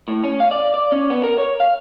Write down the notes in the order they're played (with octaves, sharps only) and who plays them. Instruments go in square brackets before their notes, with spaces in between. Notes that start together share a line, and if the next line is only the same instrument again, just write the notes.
[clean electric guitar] A2
C#4
F5
D5
D5
C#4
B3
A#4
C#5
F5